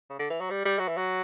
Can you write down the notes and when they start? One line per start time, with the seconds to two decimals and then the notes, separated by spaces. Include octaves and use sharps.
0.10 C#3
0.19 D3
0.30 E3
0.40 F#3
0.50 G3
0.65 G3
0.79 F#3
0.88 E3
0.97 F#3